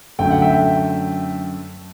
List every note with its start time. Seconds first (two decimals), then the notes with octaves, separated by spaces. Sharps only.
0.19 F#2 D3 A3 G5
0.31 F#5
0.42 E5 G5